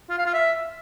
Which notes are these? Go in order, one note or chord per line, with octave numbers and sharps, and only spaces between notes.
F4
F5
F4
E5